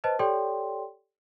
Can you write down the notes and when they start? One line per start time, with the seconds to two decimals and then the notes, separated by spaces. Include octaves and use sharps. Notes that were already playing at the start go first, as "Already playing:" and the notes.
0.04 B4 C5 D#5 A5
0.19 G4 A4 C#5 D5 G5 C6